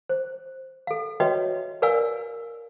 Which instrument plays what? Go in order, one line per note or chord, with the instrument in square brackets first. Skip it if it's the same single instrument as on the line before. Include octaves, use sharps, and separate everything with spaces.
[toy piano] C5
A4 F5
F#4 B4 C#5 D#5 E5 G5
A#4 B4 D5 F5 G#5 E6